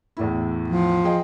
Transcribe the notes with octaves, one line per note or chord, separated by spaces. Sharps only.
E2 A2 E4
F3
G#4 D#5 G5